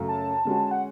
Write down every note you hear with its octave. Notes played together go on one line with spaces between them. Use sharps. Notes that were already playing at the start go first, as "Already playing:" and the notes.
Already playing: F#2 C#3 F#3 A3
A5
D3 G#3 C#4 F#4
F#5